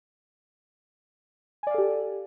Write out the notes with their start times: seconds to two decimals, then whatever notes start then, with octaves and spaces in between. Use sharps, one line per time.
1.63 G#5
1.67 D5
1.71 F5
1.74 A4
1.78 G4